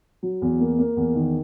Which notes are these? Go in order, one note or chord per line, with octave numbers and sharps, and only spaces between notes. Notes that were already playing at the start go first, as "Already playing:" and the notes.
F#3
E2
A#3
A#3
E2
D#3